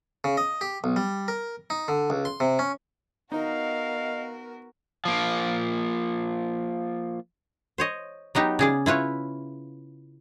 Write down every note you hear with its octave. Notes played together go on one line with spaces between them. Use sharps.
C#3
D#5
G4
B1
G3
A#4
D#4
D3
C#2
C6
C3
C#4
B3 D#4 F#4 A#4 D#5 F5
F3 A#3
C5 C#5 D#5
F#3 B3 D#4 G4
C#3 G#4 D5
E4 F4 B4 C#5